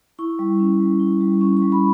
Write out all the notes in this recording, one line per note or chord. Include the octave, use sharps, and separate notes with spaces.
E4 C#6
G3
C#4
G3
E4
G3
C#4 C#6
C#6
G3
B5